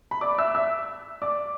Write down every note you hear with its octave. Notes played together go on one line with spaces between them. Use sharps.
B5
D5 D6
E5 E6
E5 E6
D5 D6